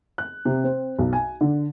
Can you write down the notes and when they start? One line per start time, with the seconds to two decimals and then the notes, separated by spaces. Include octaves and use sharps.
0.18 F#6
0.45 C3
0.64 C4
0.99 B1
1.13 G#5
1.41 D3